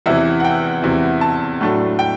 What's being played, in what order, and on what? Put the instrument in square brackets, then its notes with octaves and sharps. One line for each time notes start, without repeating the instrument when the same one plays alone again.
[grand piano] E2 C3 E3 E5
F#5
G5
E2 C3 E3
A5
A2 F#3 A3 D4
G5